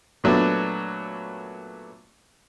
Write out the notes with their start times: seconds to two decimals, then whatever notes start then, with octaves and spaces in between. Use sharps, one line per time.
0.24 A#2 F#3 A3 B3 D4